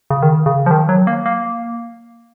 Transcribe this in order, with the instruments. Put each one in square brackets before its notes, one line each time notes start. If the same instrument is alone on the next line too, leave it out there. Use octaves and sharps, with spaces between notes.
[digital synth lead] C#3
D#3
C#3
F3
D#3
F#3
A#3
A#3